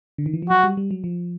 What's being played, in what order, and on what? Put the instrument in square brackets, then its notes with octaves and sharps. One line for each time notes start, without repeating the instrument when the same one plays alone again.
[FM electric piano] D3
D#3
E3
F3
[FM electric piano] F#3 [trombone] F#4
[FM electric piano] G3
G3
F#3
F3